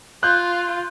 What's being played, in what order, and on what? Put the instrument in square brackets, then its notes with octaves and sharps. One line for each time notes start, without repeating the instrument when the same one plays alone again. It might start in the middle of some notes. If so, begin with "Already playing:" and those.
[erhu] F4 [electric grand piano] F#6 G6